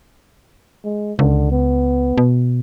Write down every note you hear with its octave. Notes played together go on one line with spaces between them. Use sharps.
G#3
C#2 D3
B3
B2